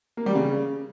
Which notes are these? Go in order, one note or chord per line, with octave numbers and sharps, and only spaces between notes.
A#3
G3
C#3